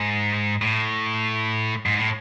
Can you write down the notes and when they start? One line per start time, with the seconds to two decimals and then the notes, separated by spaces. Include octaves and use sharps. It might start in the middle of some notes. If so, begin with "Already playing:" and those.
Already playing: G#2
0.62 A2
1.86 G#2
1.98 A2